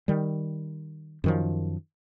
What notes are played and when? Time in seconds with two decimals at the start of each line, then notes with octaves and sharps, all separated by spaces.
0.08 D#3 G3
1.24 F#2 D#3 F3